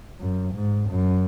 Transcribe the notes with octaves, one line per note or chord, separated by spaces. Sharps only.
F#2
G#2
F#2